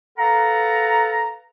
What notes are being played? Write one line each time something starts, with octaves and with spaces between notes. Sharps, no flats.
A4 B4 F5 F#5 A#5